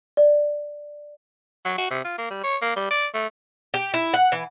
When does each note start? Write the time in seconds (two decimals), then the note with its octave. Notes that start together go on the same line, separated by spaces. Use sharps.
0.17 D5
1.65 F#3
1.78 F#4
1.90 C3
2.04 F4
2.18 A#3
2.30 G3
2.43 C#5
2.62 A#3
2.76 G3
2.91 D5
3.14 A3
3.74 G4
3.94 E4
4.13 F#5
4.32 E3